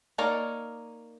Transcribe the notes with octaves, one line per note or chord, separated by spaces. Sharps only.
A#3 D#4 A#4 C#5 D5